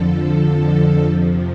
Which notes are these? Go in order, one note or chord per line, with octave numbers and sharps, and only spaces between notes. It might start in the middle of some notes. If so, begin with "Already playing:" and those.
Already playing: F2 D3 F3 A4
A4
A4
F2 C3 F3